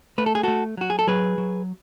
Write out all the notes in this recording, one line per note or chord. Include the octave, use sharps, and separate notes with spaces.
A3 B4
A4
G#4
A3 F#4 A4
F#3 F#4
G#4
A4
F#3 G#4 B4
F#3